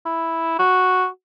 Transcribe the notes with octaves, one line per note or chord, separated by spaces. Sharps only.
E4
F#4